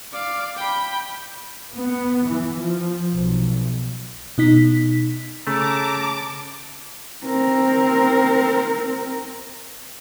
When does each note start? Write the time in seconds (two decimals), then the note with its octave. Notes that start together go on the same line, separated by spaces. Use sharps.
0.13 D5 F5
0.57 G5 B5
1.74 B3
2.28 E3
2.60 F3
3.14 B1
4.38 B2 D#4 B6
5.47 C#3 A3 A5 A#5 D6
7.25 C4 A#4